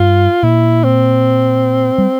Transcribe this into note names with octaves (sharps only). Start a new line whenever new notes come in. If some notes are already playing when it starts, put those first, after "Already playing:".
Already playing: G2 G3 F4
A#2 A#3 E4
C4
G3